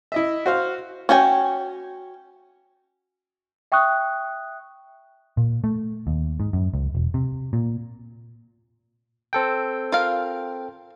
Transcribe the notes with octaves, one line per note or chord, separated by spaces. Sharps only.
E4 D#5 E5
F#4 C5 F5
C#4 F#4 G5 G#5
E5 G5 C#6 D#6 F#6
A#2
A3
D#2
G#2
F#2
C#2
E1
C3
A#2
C4 A4 G5
F4 A#4 F5